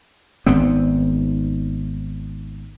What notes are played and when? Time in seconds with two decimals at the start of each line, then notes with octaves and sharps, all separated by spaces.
0.46 G#1 G#2 B3 C4